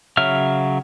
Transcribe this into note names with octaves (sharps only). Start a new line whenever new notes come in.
C#3 F#3 E5 F6